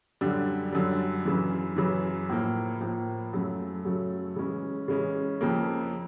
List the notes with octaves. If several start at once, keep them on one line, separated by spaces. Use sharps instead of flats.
F#2 D3 G3
F#2 D3 G3
F#2 C#3 E3
F#2 C#3 E3
A2 F3 A#3
A2 F3 A#3
F#2 C#3 F#3 A3
F#2 C#3 F#3 A3
C#3 E3 G#3 C#4
C#3 E3 G#3 C#4
F2 C#3 F3 A#3